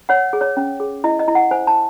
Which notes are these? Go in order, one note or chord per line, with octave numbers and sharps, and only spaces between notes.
C#5 F#5
G#4
C#5
C#4
G#4
E4 D#5
D#5
E4
F#5
C5 G#5
A5